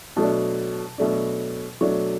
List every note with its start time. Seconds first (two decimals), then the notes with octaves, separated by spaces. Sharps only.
0.16 B2 F#3 A3 D4 A5
0.98 B2 F#3 A3 D4
1.81 B2 F#3 A3 D4 C#6